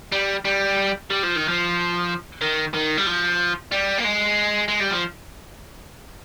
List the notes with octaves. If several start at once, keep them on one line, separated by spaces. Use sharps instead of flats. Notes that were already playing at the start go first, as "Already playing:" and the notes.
G3
G3
G3
F3
D#3
F3
D#3
D#3
G3
F3
G3
A#3
G#3
G#3
G3
F3